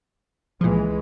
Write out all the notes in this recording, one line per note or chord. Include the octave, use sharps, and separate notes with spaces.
C#2 A#2 E3 F3 G#3